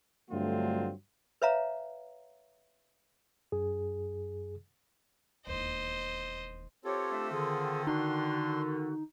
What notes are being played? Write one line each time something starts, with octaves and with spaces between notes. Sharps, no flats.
G2 D3 F#3 A3 C4 F4
B4 C#5 E5 F5 A#5
F#2 G#4
E1 D#2 C5 D#5
C4 F4 G4 A4 C#5
A3 D4 E5
D3 D#3 G#4
D4 D#4 F#4 C6